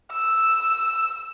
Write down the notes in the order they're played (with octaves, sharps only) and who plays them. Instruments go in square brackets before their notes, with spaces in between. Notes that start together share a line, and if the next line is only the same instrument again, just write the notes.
[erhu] E6